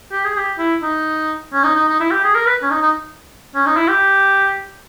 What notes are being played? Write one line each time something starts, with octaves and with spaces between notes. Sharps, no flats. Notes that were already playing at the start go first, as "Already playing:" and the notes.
G4
G#4
G4
E4
D#4
C#4
D#4
D#4
D#4
E4
G4
G#4
A#4
B4
C#4
D#4
D#4
C#4
D#4
E4
G4